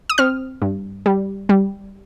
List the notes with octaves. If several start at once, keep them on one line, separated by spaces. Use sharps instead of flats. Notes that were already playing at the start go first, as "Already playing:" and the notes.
D#6
C4 F6
G2
G3
G3